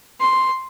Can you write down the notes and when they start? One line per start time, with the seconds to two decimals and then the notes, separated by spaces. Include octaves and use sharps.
0.21 C6